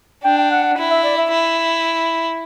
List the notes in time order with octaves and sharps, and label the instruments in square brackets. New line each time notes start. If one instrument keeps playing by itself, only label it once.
[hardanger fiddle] D4 [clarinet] G5
[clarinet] G5
F#5
F#5
[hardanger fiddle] E4
[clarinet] E5
D5
E5
[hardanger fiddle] E4